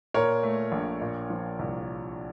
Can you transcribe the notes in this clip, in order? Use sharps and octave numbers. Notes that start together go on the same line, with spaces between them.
A#2 A#4 C#5
A3
A#1
A#2
F3
C2